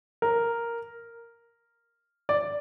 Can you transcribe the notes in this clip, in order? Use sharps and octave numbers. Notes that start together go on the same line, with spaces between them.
A#4
D5